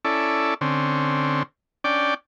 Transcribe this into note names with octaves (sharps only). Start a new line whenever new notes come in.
C#4 E4 A4 D5
D3 C4 C#4
C#4 D4 D5 G5